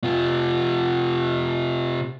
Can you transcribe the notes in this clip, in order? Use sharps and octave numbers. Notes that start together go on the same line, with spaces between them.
C3 F4